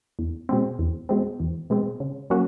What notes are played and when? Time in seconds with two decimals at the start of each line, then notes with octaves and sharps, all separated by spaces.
0.19 E2
0.49 B2 G#3 C4
0.79 E2
1.09 B2 G#3 C4
1.40 E2
1.70 B2 G#3 C4
2.00 C#3
2.30 F#3 A#3 C#4 F#4